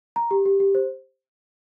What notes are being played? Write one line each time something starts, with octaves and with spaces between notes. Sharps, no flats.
A#5
G4
G4
G4
C5